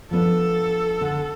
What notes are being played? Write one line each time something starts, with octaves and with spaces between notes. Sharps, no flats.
F3 B3 D4 A4
D3